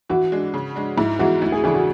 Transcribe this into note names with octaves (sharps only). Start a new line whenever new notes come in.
E3 F#4
G#3 D4
C#3
G#3 D4
G#2 E4
E3 G#3 B3 E4 F#4
D2 E4
G#4
C#3 E3 A3 D4 G#4
F#4